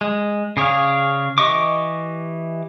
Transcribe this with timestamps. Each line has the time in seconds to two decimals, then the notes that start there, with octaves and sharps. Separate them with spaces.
0.01 G#3
0.57 C#3 G#4 C#5 D5 F5
1.38 E3 G4 D#5 C#6 D6